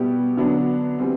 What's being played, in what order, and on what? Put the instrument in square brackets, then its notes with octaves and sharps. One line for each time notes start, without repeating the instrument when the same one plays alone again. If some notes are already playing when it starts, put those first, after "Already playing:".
Already playing: [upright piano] B2 G3 B3 E4 G4
D3 F#3 B3 D4
E3 G3 C4